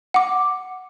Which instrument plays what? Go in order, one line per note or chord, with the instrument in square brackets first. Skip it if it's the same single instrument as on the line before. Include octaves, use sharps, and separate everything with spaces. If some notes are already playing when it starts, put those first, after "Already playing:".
[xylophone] F#5 D6